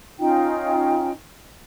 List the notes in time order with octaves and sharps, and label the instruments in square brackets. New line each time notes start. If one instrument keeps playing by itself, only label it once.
[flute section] C#4 D#4 F4 G5